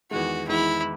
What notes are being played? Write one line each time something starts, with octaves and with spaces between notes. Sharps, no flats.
E2 D#3 G#3 F#4
E2 D#3 G#3 E4